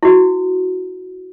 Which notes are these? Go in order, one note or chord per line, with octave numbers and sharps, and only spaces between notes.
E4 F#4